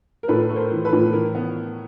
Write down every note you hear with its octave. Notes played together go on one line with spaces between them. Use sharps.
A#4
A2 A4 B4
A3
A#4 C5
E3
A4 B4
A2
E3 A#4
B3